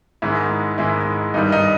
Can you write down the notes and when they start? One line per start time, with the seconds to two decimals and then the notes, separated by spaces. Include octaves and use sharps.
0.22 G#2 D#3 G#3 E4
0.78 G#2 D#3 G#3 E4
1.34 G2 D#3 G3 D#4
1.52 D#4